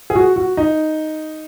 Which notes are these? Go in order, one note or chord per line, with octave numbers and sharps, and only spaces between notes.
G#4
F#4
F#4
D#4